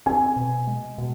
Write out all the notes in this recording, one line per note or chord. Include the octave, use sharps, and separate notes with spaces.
C4 G#5
B2
G#3
B2